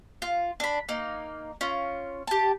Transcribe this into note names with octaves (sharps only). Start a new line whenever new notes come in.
F4
D4 B5
A#3 D#4
C#4 F4
G4 A5